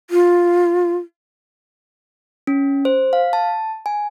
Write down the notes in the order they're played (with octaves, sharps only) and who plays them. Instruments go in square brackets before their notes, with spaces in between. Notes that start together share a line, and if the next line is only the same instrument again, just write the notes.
[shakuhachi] F4
[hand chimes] C#4
C5
F5
A5
G#5